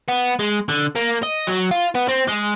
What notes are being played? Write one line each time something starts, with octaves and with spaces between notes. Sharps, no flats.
B3
G#3
D3
A#3
D#5
F#3
F4
B3
C4
G#3